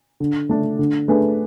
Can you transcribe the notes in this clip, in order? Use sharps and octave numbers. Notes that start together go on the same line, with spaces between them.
D3
A3 D4
D3
A3 D4 G#4 B4